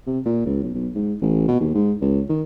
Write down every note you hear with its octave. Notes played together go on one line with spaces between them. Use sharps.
C3
A#2
C#2
B1
B1
G#2
A1
B2
D#2
G#2
C#2
D#3